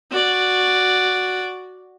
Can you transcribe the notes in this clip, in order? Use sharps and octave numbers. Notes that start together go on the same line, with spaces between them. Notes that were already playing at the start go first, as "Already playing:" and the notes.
F#4 D5